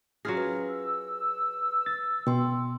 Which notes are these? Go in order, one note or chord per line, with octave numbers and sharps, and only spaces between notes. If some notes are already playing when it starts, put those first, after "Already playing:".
F#3 C#4 F4 G#4 F6 A#6
B4
E6
A6
B2 G5 C6